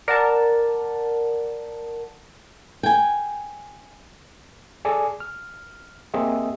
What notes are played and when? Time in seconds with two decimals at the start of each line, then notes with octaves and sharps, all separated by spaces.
0.08 A#4 D5 F#5 A5
2.83 G5 G#5
4.85 G#4 A4 D5 G#5
5.20 F6
6.14 A#3 C4 G4 G#4 D#5 E5